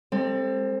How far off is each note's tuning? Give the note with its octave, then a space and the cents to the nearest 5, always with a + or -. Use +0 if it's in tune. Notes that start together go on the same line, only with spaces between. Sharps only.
G#3 -35 C4 +15 A4 +35